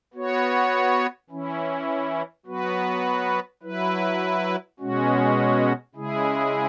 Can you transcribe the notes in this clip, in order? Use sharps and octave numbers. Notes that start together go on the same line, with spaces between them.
B3 F#4 C#5
E3 C#4 E4
F#3 B3 F#4 B4
F#3 E4 B4
B2 G#3 C#4 F#4
C#3 G#3 E4 G#4